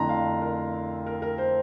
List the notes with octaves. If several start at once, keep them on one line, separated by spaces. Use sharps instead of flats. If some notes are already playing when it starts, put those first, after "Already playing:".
Already playing: F2 D3 A3 E4 A#5 C6
F5
A#4
A#4
A#4
C5